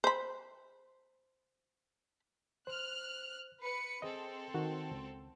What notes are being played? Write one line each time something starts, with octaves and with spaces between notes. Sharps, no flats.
C5 B5
C5 F6 F#6
B4 C#7
C4 G#4 A4 D#5
D#3 F#4
C#2